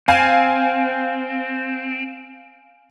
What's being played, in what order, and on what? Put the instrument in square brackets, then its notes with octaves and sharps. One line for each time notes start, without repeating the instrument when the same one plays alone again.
[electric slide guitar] C4 [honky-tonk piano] F5 G#5